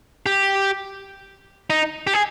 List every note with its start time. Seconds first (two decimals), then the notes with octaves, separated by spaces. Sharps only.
0.26 G4
1.70 D#4
2.07 G4
2.14 G#4